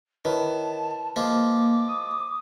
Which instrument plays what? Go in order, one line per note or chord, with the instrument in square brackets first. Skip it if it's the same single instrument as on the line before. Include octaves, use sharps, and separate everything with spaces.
[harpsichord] D#3 [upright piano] E4 B4 C#5 [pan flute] A5
[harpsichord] F3 G#3 [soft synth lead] A#3 [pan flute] D6
[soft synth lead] D#6